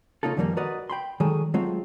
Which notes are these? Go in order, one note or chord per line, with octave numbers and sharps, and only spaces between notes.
C#3 A#3 D#4 F4 A4
F#2 D#3 F3 G3 A3 A#3
F#4 A#4 B4 D5 D#5 F#5
G5 B5 C6
D#3 F#3 G#3 G#4 A4
F#3 G#3 A3 C4 F4